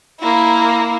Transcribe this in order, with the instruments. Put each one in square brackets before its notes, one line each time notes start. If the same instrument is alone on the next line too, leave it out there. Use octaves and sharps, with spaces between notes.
[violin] A#3 E4